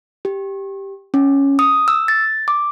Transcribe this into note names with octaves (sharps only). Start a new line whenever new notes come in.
G4
C#4
D#6
E6
A6
D6